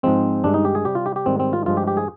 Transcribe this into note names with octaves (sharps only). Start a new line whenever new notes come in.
G#2 F3 G#3 C4
G2 D#3 G#3 D4
D#4
G4
G#4
C3 G3 G4
F4
G4
G4
G#2 D#3 G3 C4
C4
F4
G2 F3 G#3 F4
G4
G4
G#4